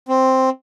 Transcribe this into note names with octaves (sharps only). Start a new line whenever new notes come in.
C4